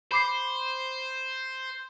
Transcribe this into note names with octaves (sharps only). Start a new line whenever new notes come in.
C5 B5 D6 C7